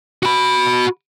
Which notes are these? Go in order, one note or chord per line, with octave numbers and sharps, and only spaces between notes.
F#4 B5